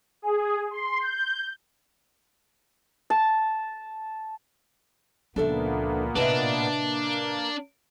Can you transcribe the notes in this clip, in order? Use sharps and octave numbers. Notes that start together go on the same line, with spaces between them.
G#4
C6
G6
A5
C#2 A#2 F3 A#3 B3 D4 A4 E5
A2 C3 D4 B4 D#5 E5
A#3